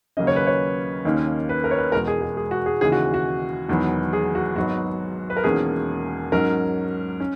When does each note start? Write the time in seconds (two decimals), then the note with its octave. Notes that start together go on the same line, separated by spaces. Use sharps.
0.17 D#2 C#3 F#3 A#3 C#4 D#5
0.27 C#5
0.36 B4
0.47 C#5
1.05 D#2 D#3 A#3 C#4
1.49 B4
1.64 A#4
1.71 C#5
1.78 B4
1.92 E1 E2 B2 G#3 A#4
2.07 G#4
2.21 G#4
2.37 G#4
2.51 F#4
2.66 G#4
2.81 D#2 C#3 E3 G#4
2.92 F#4
3.14 F#4
3.69 E1 E2 D#3 F#3 B3
4.13 G#4
4.35 F#4
4.56 G#1 G#2 F#3 B3 F#4
5.30 B4
5.37 A#4
5.44 E1 E2 D#3 A#3 C#4 G#4
6.32 G#2 F#3 C#4 A#4
7.20 C#4